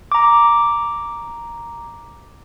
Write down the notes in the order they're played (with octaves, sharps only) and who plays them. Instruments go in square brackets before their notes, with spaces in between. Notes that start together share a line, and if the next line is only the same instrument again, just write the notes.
[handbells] A#5 D6